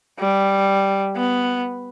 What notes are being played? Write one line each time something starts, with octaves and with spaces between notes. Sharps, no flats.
G3
B3